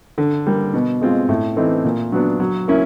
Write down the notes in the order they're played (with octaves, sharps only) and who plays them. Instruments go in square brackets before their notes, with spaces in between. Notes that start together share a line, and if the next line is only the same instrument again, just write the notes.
[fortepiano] D3
G3 A#3
B2
G#3 C4 F4
A2
E3 A3 C4 D#4
A#2
F#3 B3 D4
F#3
A#3 C#4 E4